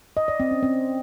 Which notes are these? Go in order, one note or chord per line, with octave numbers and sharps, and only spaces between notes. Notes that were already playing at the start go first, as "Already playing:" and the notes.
D#5
D5
C4
C#4
C4